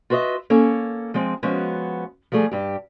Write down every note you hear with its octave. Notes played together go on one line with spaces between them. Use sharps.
F4 F#4 B4 C#5 D#5 E5
A#3 C#4 A4
F3 G#3 C4
F3 G#3 B3 C#4 F#4
F3 G3 A3 G#4
G2 G4